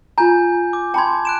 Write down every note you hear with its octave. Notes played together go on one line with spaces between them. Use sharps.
F4 G#5 A#5 G6
D6
G5 A5 B5 C6 G#6
F#6 D7 E7